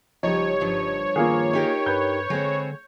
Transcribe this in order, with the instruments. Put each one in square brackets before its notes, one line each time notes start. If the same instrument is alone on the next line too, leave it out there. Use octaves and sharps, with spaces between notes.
[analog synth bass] F#1 [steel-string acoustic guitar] F3 [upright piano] G3 D#4 [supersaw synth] C#5
[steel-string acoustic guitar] G2 F3
[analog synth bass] D#3 [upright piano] A#3 F4 G#4
[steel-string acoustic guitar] D#4 G4 A#4
[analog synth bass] G2 [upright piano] B4 G6
[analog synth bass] D3 [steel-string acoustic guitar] G#3 C4